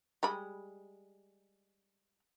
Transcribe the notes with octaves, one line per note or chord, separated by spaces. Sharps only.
G3 G#3 B5